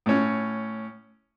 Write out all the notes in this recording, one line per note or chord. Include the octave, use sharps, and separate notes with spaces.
A2 C#4